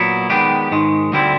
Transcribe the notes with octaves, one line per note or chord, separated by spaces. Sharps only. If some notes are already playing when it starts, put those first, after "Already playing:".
Already playing: A#2 F#3 B3 E4
D#3 G#3 B3 D4 G4
G#2 D#3 G#3
D2 D3 G3 C4 E4